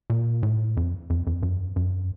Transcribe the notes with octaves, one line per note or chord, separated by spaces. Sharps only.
A#2
A2
F2
F2
F2
F#2
F#2